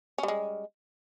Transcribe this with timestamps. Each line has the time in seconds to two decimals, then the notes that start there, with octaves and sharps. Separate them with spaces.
0.18 C#4
0.23 G3
0.28 G#3